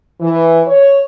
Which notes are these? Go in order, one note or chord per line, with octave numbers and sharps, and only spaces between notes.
E3
C#5